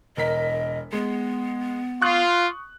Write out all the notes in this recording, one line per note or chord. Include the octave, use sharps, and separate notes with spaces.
E1 A#4 D#5 B6
G#3 B3
F4 C#6 D#6 F#6